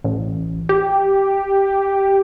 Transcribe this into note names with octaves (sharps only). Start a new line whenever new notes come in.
A1
G4